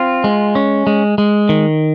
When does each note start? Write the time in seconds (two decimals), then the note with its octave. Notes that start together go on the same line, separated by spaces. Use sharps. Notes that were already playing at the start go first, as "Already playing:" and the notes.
Already playing: C4 F4
0.24 G#3
0.55 C#4
0.87 G#3
1.18 G#3
1.49 D#3